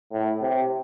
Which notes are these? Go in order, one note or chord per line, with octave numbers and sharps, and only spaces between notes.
A2
C3